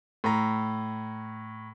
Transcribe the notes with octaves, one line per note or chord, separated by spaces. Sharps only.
A2 A#5